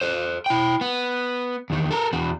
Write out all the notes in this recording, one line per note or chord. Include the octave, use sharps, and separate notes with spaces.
A4 C5
E4 G5
B3
E2 D#3
A4 A#4
E2 F#4